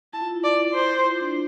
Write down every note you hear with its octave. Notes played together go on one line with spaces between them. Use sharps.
E4 A5
F4
E4
D5
C5
F4
D4